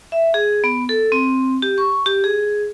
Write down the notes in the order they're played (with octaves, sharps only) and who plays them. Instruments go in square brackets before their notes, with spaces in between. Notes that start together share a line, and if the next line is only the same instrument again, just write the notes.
[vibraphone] E5
G#4
B3
A4
C4
G4
C#6
G4
G#4